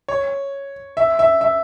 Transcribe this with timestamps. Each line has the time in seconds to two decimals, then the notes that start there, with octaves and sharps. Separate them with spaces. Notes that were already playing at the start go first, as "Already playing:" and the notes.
0.08 C#5
0.97 E5
1.19 E5
1.41 E5